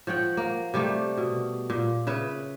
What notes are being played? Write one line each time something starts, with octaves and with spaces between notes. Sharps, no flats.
F3 C#5 F#5 G5
A#3
C3 G3 A3
B2
A#2
C#3 B4 E5